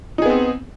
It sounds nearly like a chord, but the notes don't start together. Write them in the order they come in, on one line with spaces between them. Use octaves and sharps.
D#4 G#4 B3 C4